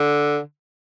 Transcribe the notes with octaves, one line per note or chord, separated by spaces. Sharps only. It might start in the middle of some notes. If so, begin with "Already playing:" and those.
Already playing: D3